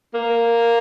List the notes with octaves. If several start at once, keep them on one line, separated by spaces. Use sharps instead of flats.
A#3